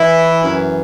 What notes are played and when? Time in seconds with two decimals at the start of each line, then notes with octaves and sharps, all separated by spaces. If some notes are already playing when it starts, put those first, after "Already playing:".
Already playing: E3 E4
0.43 F#2
0.48 E3